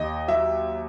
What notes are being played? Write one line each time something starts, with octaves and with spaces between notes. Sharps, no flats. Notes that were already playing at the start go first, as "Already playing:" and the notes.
Already playing: D#2 D#5
F#3 E5